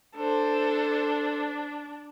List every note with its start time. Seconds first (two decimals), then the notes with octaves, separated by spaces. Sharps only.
0.16 D4 A4 C5